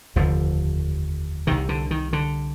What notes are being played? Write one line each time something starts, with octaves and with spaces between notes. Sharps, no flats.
F1 D#2 D3 F3
C2 C3 D#3
D3
D#3
D3